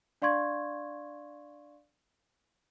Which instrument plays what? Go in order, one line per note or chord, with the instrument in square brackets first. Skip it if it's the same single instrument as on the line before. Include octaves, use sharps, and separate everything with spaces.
[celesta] D4 D5 F5 C6 C#6 G#6